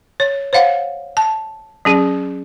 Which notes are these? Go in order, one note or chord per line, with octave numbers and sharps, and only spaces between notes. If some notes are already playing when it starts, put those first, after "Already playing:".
C#5
C5 C#5 F5 F#5
A5
F#3 C#4 G#4